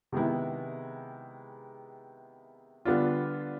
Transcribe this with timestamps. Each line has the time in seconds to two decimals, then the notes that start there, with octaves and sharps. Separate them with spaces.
0.12 C3 D#3 G#3 B3 E4
2.85 D3 G3 B3 D4 F4